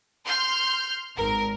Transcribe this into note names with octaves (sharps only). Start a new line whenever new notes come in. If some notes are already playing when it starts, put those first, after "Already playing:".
C6 F6 G6
G#1 A#4